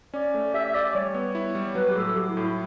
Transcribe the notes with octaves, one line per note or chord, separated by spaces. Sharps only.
C#4 D5
A3
G4 E5
E5
G4 D5
D5
G3 C#5
B3
E4
G3
F#3 B4
G4
A2 A4
F#3 G4
E4
A2
E4